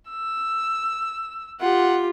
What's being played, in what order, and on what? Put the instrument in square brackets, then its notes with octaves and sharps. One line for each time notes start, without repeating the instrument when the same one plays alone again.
[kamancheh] E6
[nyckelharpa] F4 G4 [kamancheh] F#5